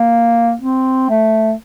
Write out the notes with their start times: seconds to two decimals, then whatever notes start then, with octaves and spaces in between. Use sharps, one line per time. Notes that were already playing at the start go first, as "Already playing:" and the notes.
Already playing: A#3
0.62 C4
1.09 A3